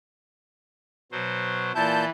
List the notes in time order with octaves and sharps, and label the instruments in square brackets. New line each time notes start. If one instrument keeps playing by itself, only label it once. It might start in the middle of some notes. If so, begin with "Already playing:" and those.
[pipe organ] B2 F#3 C5
[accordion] A#2 A5 G6 [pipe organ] E3 E4